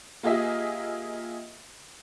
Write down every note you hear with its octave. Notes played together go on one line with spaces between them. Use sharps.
A#3 F4 G4 G#4 D#5 E5